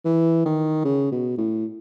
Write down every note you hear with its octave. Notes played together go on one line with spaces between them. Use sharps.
E3
D#3
C#3
B2
A2